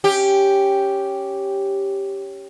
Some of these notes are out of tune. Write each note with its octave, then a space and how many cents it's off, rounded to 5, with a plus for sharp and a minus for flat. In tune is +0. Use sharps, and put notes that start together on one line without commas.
C#4 +0 G4 +0